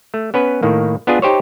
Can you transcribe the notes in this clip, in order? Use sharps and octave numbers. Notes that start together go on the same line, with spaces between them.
A3
B3 C#4 B4
A2 D#3 A#3
B3 D4 F4 G#4
D#4 G4 C5 C#5